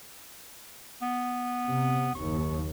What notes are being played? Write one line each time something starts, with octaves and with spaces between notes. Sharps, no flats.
B3
C3
F#1 D#2 C#6